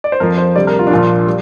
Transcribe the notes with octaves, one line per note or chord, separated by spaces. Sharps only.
D5
C5
F2 F3 A#4
C5
D2 C3 G3 D5
A#4
F4
D4
A#1 A#2 F3 F4
G3